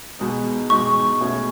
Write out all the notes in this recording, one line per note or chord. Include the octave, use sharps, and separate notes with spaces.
B2 G#3 D#4
B2 G#3 D#4 C#6
B2 A3 C#4 G#4